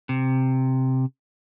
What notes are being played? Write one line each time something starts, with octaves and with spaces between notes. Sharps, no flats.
C3